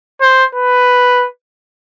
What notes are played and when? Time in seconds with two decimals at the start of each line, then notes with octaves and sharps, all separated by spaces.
0.21 C5
0.55 B4